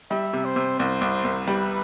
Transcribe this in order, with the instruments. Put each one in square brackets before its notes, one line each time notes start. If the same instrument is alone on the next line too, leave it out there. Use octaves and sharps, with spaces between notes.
[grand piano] G3 [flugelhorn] E5
[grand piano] C3
[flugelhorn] C5
[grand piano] C3
[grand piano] C2 [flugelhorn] C5
[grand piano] C2
C2
[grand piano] G3 [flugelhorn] B4